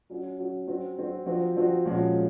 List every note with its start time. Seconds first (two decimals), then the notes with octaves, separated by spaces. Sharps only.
0.10 F#3 C#4 F#4
0.39 F#3 C#4 F#4
0.67 F#3 C4 F#4
0.98 F#3 C4 F#4
1.26 F3 C4 F#4
1.56 F3 C4 F#4
1.85 A#2 F3 G#3 C#4 F#4
2.14 G#3